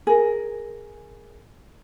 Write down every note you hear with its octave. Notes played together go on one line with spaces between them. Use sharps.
G#4 A#4